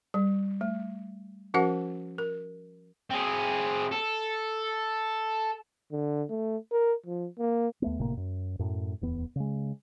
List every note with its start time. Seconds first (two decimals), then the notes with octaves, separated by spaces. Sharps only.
0.14 G3
0.61 A3
1.54 F3 C#4 F#4 A#4 F#5
2.18 A#4
3.10 C4 G#4
3.92 A4
5.92 D3
6.30 A3
6.72 A#4
7.06 F3
7.39 A#3
7.82 D#2 A3 B3
7.99 G1 A2 C3 A#3
8.17 F#2
8.59 F#2 A2
9.01 D1 E2 B3
9.36 C#3 G#3